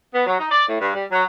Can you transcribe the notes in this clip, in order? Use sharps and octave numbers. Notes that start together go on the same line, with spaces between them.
B3
F#3
D#4
D5
A2
G2
G3
F#3